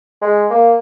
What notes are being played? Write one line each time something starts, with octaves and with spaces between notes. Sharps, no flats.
G#3
A#3